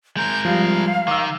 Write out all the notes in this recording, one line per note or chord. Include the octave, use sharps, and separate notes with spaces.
G#3 A#4 G6
F3 G3 F5
D#3 D6 E6